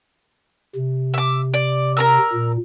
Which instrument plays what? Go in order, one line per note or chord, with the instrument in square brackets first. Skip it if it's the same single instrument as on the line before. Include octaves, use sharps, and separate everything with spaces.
[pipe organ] C3
[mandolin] E5 D6
D5
A#4 A#5 E6
[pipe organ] A#2